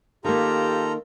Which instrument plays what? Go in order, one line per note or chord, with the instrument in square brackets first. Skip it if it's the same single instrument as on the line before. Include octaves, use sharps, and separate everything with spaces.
[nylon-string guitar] D#3 A#3 [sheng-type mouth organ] F4 A4 A#5 [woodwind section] G4